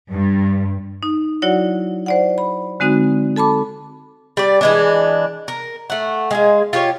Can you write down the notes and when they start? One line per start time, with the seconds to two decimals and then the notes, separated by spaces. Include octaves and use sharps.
0.10 G2
1.03 D#4
1.42 F#3 E4 F#4 C#5 D5 F#5
2.06 C5 D5 F#5
2.38 B5
2.80 D3 G#3 C4 D#4 F#4
3.36 A4 A5 B5 D6
4.37 G3 D5
4.61 E3 G#3 D4
5.48 A#4
5.90 A3 F#5
6.31 G#3 G#4 F5
6.73 F4 G4 C5 C#5